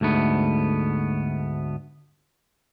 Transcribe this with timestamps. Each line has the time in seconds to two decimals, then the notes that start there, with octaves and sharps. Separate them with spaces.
0.01 D2 G#2 A3 B3